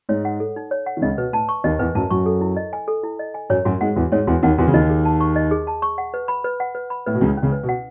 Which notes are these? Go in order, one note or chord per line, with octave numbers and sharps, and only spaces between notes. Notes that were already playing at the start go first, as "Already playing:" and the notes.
G#2 G#3 C#5
F#5
A4
D#4
C#5
F#5
D#3
C#2 C#3 D#5
B2 B4
A2 A5
C#6
D#2 D#3 D#5
E2 E3 B4
F#2 F#3 A5
F#2 F#3 C#6
A4
E4
D#5
G#5
A4
E4
D#5
G#5
F#2 F#3 C#5
F#2 F#3 F#4
G#2 G#3 F#5
E2 E3 F#4
G#2 G#3 C#5
E2 E3 F#4
D#2 D#3 F#5
E2 E3 F#4
C#3
D#2 D#3 D#5
G#4
A5
C#6
D#5
G#4
A5
C#6
F#5
B4
B5
B4
F#5
B4
B5
A2 B4
B2
C#2 C#3 E4
C#4
C#2 C#3
B4
B2
F#5